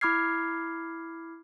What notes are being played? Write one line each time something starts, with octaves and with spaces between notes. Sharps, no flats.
E4 B5 D6 F6 G#6 C7